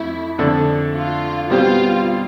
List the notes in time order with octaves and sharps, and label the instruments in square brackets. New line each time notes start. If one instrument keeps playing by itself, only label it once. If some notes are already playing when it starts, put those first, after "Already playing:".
Already playing: [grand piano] F2 A3 [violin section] E4
[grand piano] F2 D3 A3 D4 A4
[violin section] F4
[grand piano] B2 G3 C4 G4 C5 [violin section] F4